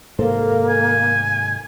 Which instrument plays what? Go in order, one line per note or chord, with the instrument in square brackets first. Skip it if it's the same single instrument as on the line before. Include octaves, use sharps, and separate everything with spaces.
[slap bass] G#2 C3 D#3 [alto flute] A#3 [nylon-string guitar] A4 C5
[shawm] G#5